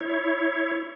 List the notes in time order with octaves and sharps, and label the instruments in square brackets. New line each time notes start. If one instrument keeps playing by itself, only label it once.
[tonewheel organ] E4 C#5